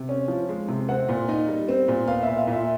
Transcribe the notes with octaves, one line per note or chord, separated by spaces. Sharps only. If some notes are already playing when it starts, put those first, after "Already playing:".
Already playing: C3
C#4
F3
G#3
C3
C4 F#5
A#2
D#4
G3
C4
A#2
B3 F5
A#2 E5
F5
A#2
E5